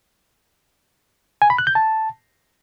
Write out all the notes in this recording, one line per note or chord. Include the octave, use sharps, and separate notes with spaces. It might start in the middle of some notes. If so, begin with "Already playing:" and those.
G#5
B5
F#6
G6
A5